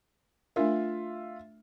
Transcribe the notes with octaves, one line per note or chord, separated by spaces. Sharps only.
A3 D4 F4 A#4 E5